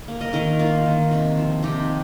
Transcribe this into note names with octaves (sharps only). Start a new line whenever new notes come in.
A#3
A#4 D#5
D#3 A#4 D#5
A#3 F4 A#4
D#3
C3
F3
C3 D#4 G4